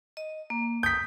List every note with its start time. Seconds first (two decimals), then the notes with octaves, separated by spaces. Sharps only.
0.17 D#5
0.50 A#3
0.83 D#6 G6 B6